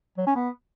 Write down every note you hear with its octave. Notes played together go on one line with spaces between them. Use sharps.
F#3
C#4
B3